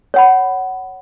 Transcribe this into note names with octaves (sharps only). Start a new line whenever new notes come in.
C#5 F#5 B5